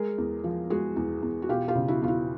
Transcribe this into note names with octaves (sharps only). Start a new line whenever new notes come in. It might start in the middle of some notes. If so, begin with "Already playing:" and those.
Already playing: G#3 G#4 A#4
E2
F3
G#3 F#4 G#4
E2
E2
F#4
E1 F4 G4
F4 G4
C#3
E4 F#4
E2 F4
E4 F#4